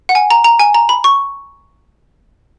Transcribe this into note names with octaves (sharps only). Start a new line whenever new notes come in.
F#5
G#5
A#5
A#5
G#5
A#5
B5
C#6